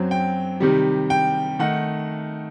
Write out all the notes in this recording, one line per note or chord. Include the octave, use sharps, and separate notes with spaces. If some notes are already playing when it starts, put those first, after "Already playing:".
Already playing: F#2 F#3 C4
G5
C3 D#3 G3
G5
D#3 A3 D#4 F#5